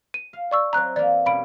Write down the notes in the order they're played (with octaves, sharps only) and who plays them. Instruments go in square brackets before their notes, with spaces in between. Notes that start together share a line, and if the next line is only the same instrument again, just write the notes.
[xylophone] D#7
[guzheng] F5
[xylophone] D5 C#6 E6
[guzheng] F#3 C4 E4 [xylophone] A#5 F#6
[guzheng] E3 A#3 [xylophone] D5
[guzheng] B2 G3 C#4 [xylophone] F5 B5 D7